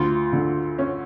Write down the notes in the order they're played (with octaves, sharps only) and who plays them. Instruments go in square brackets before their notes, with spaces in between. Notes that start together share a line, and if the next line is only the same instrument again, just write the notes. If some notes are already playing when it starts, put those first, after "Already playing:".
Already playing: [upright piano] D2 [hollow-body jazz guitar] F4
[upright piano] D3
C#4